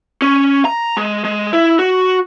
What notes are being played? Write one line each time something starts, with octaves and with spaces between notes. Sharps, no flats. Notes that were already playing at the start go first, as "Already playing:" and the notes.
C#4
A#5
G#3
G#3
E4
F#4